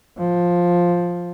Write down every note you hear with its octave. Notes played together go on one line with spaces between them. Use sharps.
F3